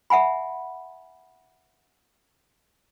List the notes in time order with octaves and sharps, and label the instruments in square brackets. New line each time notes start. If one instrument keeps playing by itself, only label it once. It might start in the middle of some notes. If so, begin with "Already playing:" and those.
[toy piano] E5 F#5 G#5 B5